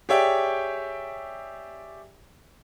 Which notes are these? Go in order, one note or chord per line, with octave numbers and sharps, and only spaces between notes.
G4 G#4 C#5 D5 E5 G5